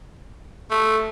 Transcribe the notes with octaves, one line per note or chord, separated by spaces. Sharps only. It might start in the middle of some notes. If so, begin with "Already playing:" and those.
A3